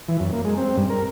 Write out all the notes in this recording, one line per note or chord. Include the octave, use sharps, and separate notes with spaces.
E3
F#2
A#3
G#3
C4
G2
A#4